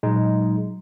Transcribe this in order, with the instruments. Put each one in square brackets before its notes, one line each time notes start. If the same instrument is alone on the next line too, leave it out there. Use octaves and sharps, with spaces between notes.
[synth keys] A#2 F#3 [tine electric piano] G#3 D#4